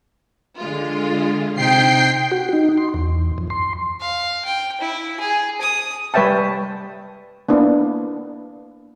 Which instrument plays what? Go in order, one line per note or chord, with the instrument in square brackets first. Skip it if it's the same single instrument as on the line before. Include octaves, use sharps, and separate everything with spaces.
[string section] D3 G#3 F4
[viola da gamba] C3 D#4 [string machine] G5 C7
[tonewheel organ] F#4
D#4
C6
E2
F2
C6
[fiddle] F5
G5
E4
G#4
D#6
[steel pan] G3 B4 C#5 E5 G5 A5
A#3 B3 D4 E4